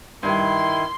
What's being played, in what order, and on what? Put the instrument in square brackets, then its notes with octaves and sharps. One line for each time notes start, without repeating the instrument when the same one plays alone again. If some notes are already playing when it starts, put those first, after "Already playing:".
[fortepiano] G2 [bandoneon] D#3 E4 [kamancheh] C6